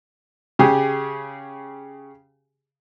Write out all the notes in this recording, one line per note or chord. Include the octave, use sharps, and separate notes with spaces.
C#3 G4 G#4